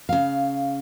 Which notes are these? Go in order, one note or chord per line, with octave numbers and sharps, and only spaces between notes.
C#3 F5